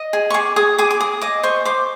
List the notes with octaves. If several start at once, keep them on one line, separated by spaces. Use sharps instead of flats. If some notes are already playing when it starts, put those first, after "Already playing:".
Already playing: D#5
G#4
C#6
G#4 D6
G#4 D#6
G#4 D6
D6
G#4 D#6
D#5 D6
C5 C#6
C5 D6